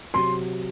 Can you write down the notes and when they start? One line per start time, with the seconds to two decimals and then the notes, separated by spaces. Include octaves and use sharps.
0.14 C3 F#3 C6